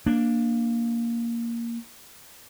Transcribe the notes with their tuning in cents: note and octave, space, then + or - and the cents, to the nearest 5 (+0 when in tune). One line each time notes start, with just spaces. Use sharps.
A#3 +0 D4 +0